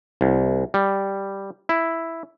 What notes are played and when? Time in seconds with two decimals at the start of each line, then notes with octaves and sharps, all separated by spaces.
0.21 C2
0.74 G3
1.69 E4